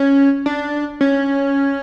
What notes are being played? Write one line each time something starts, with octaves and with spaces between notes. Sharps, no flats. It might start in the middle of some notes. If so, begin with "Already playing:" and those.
Already playing: C#4
D4
C#4